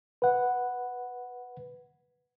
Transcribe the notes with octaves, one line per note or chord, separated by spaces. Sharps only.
B4 F#5